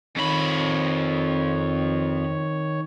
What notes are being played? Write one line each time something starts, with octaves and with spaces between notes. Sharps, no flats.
F2 D#3 C#5 B5